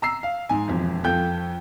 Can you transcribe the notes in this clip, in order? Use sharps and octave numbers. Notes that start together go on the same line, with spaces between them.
A#5 E6 C7
F5
G#2 G#5
E1 F2
F2 F4 A4 G5 G6